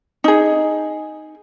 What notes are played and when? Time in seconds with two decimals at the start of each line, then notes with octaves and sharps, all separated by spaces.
0.24 D#4 G#4